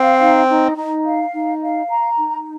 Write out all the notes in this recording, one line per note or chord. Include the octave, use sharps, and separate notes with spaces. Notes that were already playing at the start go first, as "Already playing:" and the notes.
Already playing: C4 F5
D#4
D#4
D#4
F5
D#4
F5
A#5
D#4